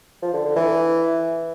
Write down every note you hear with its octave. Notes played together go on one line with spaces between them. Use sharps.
F3
D3
D3
E3